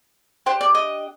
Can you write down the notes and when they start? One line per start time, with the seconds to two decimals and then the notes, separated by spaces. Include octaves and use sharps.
0.46 D4 G4 C5
0.61 D5
0.75 D#5